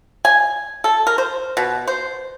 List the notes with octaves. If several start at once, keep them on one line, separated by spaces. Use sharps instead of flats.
G#5
A4
A#4
C5
B2
C5